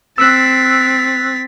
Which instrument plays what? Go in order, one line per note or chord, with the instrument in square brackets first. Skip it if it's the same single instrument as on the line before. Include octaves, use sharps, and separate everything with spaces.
[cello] C4 [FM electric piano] E6 F#6 [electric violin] A6 B6